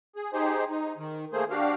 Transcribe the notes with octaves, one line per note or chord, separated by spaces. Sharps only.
G#4
D#4 G4 G#4 C5
D#4
D#3
A3 A#3 G#4 C5
D4 F#4 G4 F5